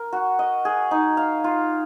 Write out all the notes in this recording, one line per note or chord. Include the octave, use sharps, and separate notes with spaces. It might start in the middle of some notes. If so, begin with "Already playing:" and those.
Already playing: A#4
F#4
D#5
G#4
D#4
F5
F4